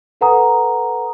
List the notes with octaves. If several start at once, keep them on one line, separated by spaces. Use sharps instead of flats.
A4 B4 F#5 G#5 A#5 D#6